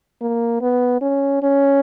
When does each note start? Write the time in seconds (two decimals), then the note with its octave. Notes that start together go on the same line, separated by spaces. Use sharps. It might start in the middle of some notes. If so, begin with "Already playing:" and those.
0.21 A#3
0.61 B3
1.02 C#4
1.43 C#4